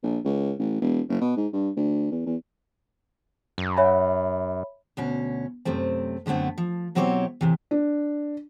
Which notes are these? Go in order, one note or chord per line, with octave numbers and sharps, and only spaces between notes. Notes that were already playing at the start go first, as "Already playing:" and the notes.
A#1
C#2
A1
E1
F#1
B2
G#2
G2
D2
E2
E2
F#2
C#5 E5 B5
D2 B2 C#4
F#2 C3 A3 C4
F#2 D3 A3 B3 C4
F3
B2 F#3 C4 E4 G4 C#5
A2 C3 E3
D4